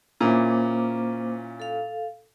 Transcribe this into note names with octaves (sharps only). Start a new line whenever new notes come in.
A#2 A#3 C#4 E4 C5 D6
A4 F5